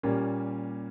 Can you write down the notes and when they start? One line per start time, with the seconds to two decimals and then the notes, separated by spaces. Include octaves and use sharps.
0.03 A#2 G3 A#3 C#4